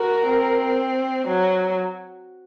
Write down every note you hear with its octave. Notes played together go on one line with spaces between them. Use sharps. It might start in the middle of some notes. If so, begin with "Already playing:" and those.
Already playing: F#4 A#4
C4
F#3